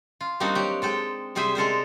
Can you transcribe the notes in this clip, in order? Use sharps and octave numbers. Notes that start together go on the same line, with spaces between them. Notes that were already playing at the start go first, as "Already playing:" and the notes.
F4
G3 A#3 C4 D4 D#4 F#4
F#3 G4
G#3 A4 G5
C3 G3 G#4 C5 E5
G#3 A4 A#4 C5